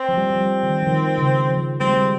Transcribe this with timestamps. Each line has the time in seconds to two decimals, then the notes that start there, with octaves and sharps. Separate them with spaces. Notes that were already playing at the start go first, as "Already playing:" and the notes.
Already playing: C4
0.09 F3
0.17 G3
0.30 F3
0.41 G3
0.63 D#3
0.83 F3
0.87 D#3
1.18 C#3
1.50 F3
1.80 G3 C4
1.88 G#3
1.97 G3